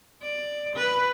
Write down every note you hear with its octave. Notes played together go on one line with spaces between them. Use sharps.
D5
B4